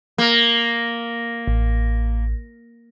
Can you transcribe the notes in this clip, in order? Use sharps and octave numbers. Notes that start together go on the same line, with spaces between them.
A#3
A1